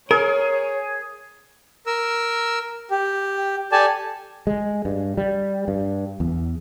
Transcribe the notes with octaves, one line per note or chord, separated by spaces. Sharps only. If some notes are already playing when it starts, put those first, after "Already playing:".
G#4 A#4 C#5
A#4 E6
G4
G4 A4 D5 G#5 A5
G#3
G2
G3
G2
E2